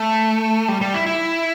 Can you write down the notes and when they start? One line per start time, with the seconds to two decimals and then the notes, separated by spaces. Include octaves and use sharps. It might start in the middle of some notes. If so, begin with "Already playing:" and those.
Already playing: A3
0.68 G3
0.81 G3
0.94 E4
1.06 E4